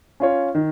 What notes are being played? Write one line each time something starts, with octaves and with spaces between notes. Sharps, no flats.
C#4 F4 C#5
D#3